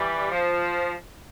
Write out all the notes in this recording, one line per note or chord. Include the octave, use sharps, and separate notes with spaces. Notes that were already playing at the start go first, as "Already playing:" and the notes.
Already playing: E3 G3
F3